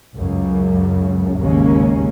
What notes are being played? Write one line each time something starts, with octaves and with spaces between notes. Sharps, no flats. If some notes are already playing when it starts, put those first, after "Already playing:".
C#2 F#2 C#3
G#1 D#2 C#3 G#3 A#3 C#4